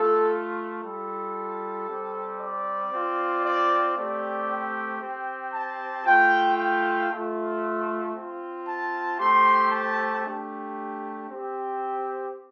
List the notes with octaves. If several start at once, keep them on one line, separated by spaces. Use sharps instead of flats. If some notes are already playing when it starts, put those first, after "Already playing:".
Already playing: A3 F4 A4
G3 F4 A4
G3 C4 G4
D5
C4 F4
D5
A3 C4 G4 D5
G5
C4 G4
A5
A3 F4 G5
G5
A3 F4
C4 F4
A5
A3 C4 G4 C6
A5
A3 D4 G4
C4 G4